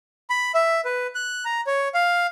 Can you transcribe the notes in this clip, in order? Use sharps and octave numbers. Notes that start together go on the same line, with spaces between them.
B5
E5
B4
F#6
A#5
C#5
F5